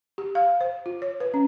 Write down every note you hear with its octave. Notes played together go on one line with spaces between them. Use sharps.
G4
F5
C5
F4
C#5
B4
C#4